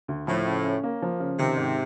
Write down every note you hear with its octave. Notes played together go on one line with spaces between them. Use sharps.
D2
A2 F3
C#3
C#4
A#3
F3
C#3
C3 D#3
G#2